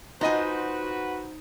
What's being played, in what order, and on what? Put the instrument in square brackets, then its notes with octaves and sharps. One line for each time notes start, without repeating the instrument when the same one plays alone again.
[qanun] D#4 C5 [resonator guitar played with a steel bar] F4 D#5 G#5 [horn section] F#4 B4